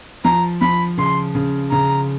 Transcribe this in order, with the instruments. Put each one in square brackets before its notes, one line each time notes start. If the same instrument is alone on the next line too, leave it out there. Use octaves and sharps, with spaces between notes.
[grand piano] F3 [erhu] A#5
[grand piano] F3 [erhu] B5
[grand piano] C#3 [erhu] C6
[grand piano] C#3
[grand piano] C#3 [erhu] A#5